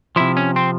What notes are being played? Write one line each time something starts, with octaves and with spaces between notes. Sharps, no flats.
C3 F3 E4
C#4
C4